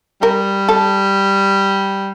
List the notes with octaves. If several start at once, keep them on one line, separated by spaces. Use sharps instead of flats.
G3 A#4
A4